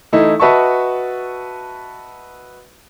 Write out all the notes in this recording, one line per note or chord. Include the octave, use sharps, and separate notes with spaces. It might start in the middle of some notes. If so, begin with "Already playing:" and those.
E3 A3 D#4 E4
F#4 B4 D#5 E5 A5 C#6